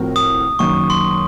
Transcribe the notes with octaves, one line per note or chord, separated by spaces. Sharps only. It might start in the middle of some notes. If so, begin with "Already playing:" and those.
Already playing: A2 F3 C4 F#4 A#4
D#6
F#2 D#3 A#3 C#6
C6